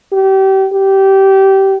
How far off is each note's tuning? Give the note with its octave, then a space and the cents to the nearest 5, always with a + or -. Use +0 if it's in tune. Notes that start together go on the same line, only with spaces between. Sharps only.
G4 -30
G4 -20